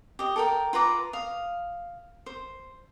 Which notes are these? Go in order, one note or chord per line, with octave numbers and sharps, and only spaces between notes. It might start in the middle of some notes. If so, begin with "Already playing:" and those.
G4 D#5
A4 A#4 G5
F4 B4 A#5 D6
F5 D#6
C5